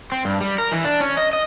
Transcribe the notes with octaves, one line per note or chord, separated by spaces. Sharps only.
C4
G2
G3
A#4
E3
D4
C#4
D#5
D#5